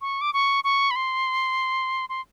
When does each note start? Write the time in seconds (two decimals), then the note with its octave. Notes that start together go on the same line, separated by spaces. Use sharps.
0.01 C#6
0.21 D6
0.34 C#6
0.64 C#6
0.91 B5
0.96 C6
2.09 C6